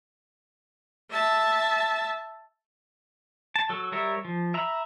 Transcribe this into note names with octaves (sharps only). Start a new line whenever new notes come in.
E5 A5
A5
F#3 A4
G3 A#4 C#5 E5
F3
E5 A#5 B5